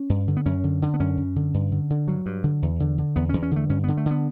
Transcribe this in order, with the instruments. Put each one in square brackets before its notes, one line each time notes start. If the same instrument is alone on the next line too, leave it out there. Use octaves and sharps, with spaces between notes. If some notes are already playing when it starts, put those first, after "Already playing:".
Already playing: [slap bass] C#4
G2
D3
B3
F#2 C#4
D3
D3
B3
F#2 C#4
F#2
D3
G2
D3
D3
G2 F#3
G2
D3
E2
D3
D3
E2 B3
E2 C#4
C#4
D3 A3
G2 C#4
D3 B3
A3
D3
B3